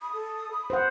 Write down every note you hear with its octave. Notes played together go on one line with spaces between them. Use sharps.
B5 D#6
A4
B5
C5 F#5